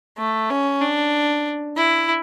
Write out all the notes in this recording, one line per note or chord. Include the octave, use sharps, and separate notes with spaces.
A3
C#4
D4
E4